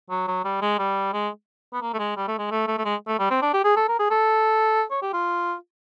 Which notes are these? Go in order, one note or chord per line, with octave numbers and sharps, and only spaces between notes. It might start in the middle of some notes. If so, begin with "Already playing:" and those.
F#3
F#3
G3
G#3
G3
G#3
B3
A#3
A3
G#3
G3
A3
G#3
A3
A3
A3
G#3
A3
G3
C4
D4
G4
G#4
A4
A#4
G#4
A4
C#5
G4
F4